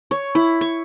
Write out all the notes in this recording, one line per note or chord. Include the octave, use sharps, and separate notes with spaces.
C#5
E4
C#6